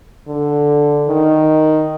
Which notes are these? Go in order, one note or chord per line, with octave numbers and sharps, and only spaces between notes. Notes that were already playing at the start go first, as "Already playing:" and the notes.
D3
D#3